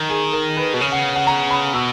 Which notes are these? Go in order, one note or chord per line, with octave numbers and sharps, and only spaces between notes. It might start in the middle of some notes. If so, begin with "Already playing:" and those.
Already playing: D#3
G#4
A#4
B4
B2
C#3
F#5
F#5
A#5
B5
B2 E6